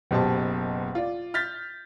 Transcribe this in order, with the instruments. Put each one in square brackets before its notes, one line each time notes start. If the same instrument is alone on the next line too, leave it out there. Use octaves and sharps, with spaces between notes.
[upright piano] F#1 B2 G4 C5 A5
F4 D5
F6 G6 A6 B6